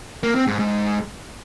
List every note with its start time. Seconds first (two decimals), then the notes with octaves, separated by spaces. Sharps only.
0.23 A#3
0.35 C4
0.47 G#2
0.59 G#2